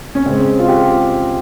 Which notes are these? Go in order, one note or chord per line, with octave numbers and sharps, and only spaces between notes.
C#4
C#3 G#3 C4
F4
G4